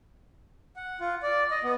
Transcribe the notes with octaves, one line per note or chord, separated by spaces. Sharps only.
F#5
F4
D5
D#5
B3